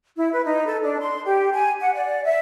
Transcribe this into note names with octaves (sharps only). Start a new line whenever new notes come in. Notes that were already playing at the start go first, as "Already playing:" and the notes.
E4
B4
D#4
A4
D4
C6
G4
G#5
F#5
D5
E5